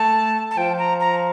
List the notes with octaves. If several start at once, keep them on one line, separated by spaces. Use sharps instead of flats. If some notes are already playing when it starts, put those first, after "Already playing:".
Already playing: A3 A5
A5
F3 G5
A#5
A#5